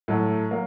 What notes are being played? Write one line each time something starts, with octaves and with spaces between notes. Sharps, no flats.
A2 F#3 A3
F#3 A#3